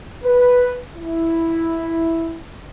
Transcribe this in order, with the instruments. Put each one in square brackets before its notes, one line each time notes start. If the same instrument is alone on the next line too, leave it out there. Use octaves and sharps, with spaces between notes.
[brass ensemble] B4
E4